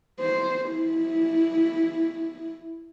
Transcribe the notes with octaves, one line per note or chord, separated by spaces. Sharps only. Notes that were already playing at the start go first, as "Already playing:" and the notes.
C5
E4